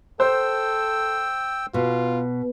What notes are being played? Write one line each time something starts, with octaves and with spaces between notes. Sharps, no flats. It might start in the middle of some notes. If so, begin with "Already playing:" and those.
A4 C5 G5 E6
B2 F4